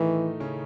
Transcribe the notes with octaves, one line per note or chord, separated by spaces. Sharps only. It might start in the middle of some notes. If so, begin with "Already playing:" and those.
Already playing: A2 D#3 E3 A3 D#4
C#3 C#4